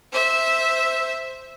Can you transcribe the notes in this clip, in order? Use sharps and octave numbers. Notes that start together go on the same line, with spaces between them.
C5 E5